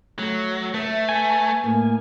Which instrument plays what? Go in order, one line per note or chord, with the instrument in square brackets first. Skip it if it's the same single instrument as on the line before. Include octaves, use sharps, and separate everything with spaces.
[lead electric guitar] F#3 [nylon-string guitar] A3
[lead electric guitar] A3 [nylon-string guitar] B4 E5
[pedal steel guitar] G#5
[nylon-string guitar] A2 A#3